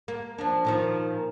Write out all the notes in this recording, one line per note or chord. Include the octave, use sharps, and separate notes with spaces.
A#3
F3 A#3 D4
A#2 D#3 F3